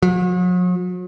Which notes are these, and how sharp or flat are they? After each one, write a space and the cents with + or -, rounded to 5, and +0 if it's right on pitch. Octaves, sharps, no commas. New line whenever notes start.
F#3 -45